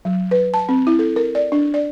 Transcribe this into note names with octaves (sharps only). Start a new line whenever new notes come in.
F#3
B4
A5
C4
E4
A4
A#4
D5
D4
D5